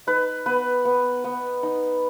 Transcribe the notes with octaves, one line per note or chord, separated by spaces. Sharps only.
D#4 B4
B3 B4
B3
B3
D#4